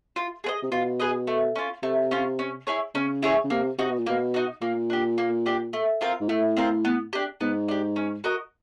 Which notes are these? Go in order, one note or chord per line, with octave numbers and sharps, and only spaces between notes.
F4
G#4 B4 D#5
C3
B2 F4
G#4 B4 D#5
A3
C#4 F4
C3 A3
C#4 F4
C#4
E4 G#4 C#5
C#3 C#4
E4 G#4 C#5
C#3
C3 A#3
C3 D#4 F#4
B2
A#2
B2 A#3
D#4 F#4
A#2 A#3
D4 G4
A#3
D4 G4
A3
C4 F4 A#4
G#2
A2 A3
C4 F4 A#4
B3
D4 G4
G#2 B3
D4 G4
C#4
F#4 A#4 D#5